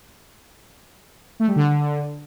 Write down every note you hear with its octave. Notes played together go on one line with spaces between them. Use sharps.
A3
G3
D3